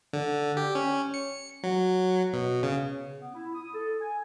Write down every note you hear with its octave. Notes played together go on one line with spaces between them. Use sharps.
D3
G4
C#4
C#7
F#3
B2
C#3
B3
E4
D#6
A4
G#5